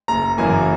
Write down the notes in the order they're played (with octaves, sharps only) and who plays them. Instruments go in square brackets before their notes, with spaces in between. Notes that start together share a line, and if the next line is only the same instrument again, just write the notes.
[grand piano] F#1 A#5
F#2 E3 A#3 G#5